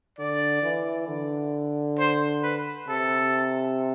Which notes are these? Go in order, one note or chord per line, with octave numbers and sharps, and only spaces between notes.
D3 D5
E3
D3
C5
B4
C3 A4